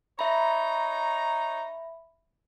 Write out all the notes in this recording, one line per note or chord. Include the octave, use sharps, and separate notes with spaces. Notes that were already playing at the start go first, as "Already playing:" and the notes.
D#4 C#5 E5 A#5 B5